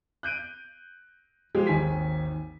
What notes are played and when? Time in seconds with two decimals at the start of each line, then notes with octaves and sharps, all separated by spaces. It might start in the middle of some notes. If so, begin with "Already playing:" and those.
0.23 F#6 G6 D7 D#7
1.55 F3 G#3 G4
1.67 G#1 D#2 D#3 G#5 B6